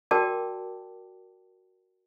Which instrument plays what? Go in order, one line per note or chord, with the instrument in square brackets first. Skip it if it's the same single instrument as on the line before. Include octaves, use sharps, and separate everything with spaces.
[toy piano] F#4 A#4 D5 G5 A5 D6